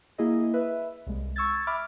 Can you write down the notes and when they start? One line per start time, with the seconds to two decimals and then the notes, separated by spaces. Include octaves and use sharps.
0.18 A#3 E4 G#4 D#5
0.54 B4 E5
1.07 C2 G#3
1.36 C#6 E6 G#6 A6
1.67 E5 B5 D6 F6